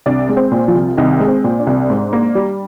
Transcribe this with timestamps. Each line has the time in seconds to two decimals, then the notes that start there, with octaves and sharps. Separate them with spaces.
0.06 C2 D4 D5
0.29 G#3
0.37 C4 C5
0.52 A#2
0.68 F3 F4
0.75 C2
0.97 C2 D#3 D#4
1.20 G#3
1.28 C4
1.44 A#2
1.59 D4
1.67 C2
1.90 G#2
2.13 A#3
2.35 G3